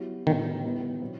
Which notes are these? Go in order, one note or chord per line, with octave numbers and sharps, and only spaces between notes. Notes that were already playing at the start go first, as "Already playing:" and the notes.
Already playing: F#3 B3 E4 G4
A2 D#3 E3 G3 B3
G3 B3 E4
B2 F#3 C4